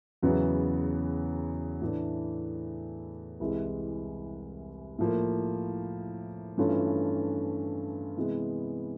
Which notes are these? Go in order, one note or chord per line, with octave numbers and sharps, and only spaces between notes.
E2 C#3 F#3 B3 E4
A2 E3 A3 D4
C2 C3 E3 G#3
A2 F3 A#3
G2 E3 A3 C#4 F4
C3 E3 G#3 B3